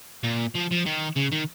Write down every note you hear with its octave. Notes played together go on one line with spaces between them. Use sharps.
A#2
F3
F3
D#3
C#3
D#3